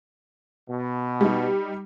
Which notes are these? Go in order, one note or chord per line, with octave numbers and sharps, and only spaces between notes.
B2
G3 D#4